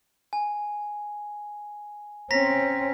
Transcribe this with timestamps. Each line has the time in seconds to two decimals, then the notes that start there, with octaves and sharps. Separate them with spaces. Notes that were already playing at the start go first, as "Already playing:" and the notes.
0.33 G#5
2.31 C4 C#4 A#5 A#6 B6